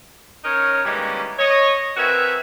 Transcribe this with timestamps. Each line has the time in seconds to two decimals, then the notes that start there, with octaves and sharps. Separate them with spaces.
0.44 C#4 D#4 A#4 C#5
0.84 D#3 E3 G3 G#3 A#3 C#4
1.39 C#5 D#5
1.97 C4 F#4 A#4 B4 E5 G#5